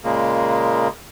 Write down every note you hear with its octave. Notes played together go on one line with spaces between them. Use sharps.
A#2 C#3 G#3 A#3